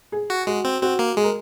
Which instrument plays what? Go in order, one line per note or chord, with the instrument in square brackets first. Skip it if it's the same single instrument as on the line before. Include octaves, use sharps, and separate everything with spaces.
[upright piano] G#4
[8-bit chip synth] F#4
[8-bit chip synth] G#3 [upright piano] F#4
[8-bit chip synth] C4
[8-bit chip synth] C4 [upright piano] F#4
[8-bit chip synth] A#3
[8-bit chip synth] G#3 [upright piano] G#4
[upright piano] A#4